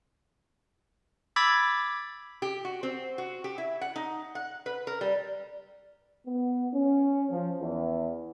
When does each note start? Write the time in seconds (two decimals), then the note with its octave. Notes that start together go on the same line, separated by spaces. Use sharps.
1.36 B5 D6 E6 G#6 A6 B6
2.42 G4
2.65 F#4
2.83 C4
3.18 F#4
3.44 G4
3.58 E4
3.81 F#5
3.96 D#4
4.35 F#5
4.66 B4
4.87 A#4
5.01 G3
6.26 B3
6.74 C#4
7.30 F3
7.59 E2